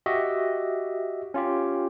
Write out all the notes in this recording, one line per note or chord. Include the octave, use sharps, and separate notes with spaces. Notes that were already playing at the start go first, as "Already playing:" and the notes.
F#4 G4 D#5 E5
C#4 F4 G4